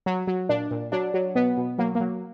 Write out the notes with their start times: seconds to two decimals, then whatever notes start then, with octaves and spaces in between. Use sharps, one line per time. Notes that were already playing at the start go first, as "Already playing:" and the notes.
0.06 F#3
0.28 F#3
0.49 A#2 D4
0.71 A#2
0.92 F#3 D4
1.14 F#3
1.35 B2 B3
1.57 B2
1.79 F#3 A#3
1.95 A#3
2.00 F#3